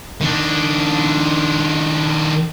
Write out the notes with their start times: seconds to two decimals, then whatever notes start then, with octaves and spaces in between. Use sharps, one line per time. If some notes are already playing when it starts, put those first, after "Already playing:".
0.21 D#3 D4